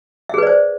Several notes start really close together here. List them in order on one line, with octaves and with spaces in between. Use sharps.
E5 G#4 B4 D5 C5